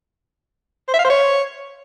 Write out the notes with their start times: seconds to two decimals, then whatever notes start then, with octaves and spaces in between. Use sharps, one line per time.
0.88 C5
0.94 E5
0.99 F5
1.05 C5
1.10 C#5